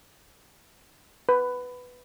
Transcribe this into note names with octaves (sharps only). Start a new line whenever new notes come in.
B4